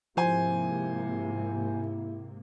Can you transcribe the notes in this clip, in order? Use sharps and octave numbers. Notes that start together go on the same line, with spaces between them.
G#2 C3 F3 A#3 E4 C5 G#5